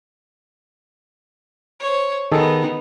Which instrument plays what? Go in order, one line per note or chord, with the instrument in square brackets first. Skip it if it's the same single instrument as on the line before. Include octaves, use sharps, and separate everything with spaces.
[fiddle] C5 C#5
[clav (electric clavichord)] D#3 G#4 A4 [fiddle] B3 D#4